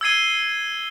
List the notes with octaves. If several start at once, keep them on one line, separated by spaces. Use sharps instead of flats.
E6 G#6 C7 D#7 G7